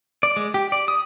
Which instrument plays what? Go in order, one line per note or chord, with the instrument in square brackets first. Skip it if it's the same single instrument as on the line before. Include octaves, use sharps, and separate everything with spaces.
[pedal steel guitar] D5
G#3
G4
D5
D#6